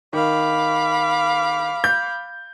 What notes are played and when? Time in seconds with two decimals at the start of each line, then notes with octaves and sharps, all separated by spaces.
0.13 D#3 F5 B5 D6
1.84 G6